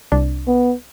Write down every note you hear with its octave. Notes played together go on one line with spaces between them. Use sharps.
C2 D4
B3